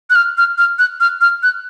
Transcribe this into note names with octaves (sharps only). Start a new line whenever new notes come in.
F#6
F6
F6
F6
F#6
F6
F6
F#6